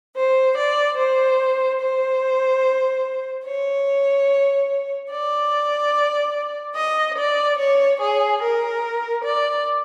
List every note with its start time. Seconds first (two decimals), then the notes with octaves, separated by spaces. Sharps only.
0.15 C5
0.56 D5
0.97 C5
1.80 C5
3.45 C#5
5.10 D5
6.75 D#5
7.17 D5
7.58 C#5
7.99 G#4
8.41 A#4
9.23 D5